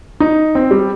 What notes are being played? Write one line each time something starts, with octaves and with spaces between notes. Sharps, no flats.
D#4
C4
G3